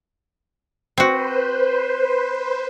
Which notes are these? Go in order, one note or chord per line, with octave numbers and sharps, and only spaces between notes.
C4 F#4 B4 C5